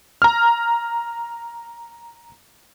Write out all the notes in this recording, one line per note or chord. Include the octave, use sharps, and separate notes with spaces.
A#5 F6